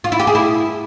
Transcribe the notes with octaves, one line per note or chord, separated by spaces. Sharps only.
F4
E4
G4
G#4
E4